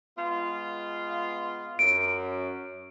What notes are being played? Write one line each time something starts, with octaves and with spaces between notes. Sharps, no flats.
G#3 B3 F4
F#2 D7